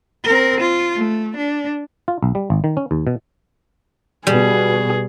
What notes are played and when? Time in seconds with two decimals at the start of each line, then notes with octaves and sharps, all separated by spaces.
0.25 C4 A#4
0.61 F4
0.96 A3
1.37 D4
2.08 F4
2.23 B1
2.35 G3
2.50 G#1
2.64 D#3
2.77 C#4
2.91 D#2
3.07 B2
4.27 B2 G3 G#4